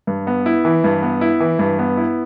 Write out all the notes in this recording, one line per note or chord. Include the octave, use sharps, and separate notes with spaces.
G2
B3
E4
E3
G2
B3
E4
E3
G2
B3
E4